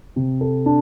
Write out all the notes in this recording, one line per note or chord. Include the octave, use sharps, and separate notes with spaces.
C3
A4
D4